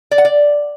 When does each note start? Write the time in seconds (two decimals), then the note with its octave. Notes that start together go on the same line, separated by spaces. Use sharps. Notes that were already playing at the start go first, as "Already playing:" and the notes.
0.11 D5
0.18 F#5
0.25 D5